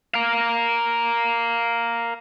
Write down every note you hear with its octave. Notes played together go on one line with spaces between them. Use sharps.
A#4 F5